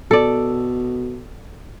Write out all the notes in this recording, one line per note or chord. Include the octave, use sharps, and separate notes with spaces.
B2 A4 D5